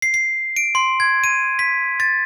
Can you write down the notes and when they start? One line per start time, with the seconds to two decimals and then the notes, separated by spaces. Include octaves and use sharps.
0.02 C7
0.14 C7
0.56 D7
0.75 C6
1.00 G#6
1.24 D#7
1.59 B6
2.00 A6